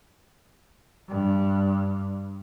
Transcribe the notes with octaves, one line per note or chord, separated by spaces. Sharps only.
G2